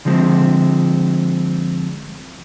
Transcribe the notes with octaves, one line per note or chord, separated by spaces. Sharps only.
D3 F3 G#3 C4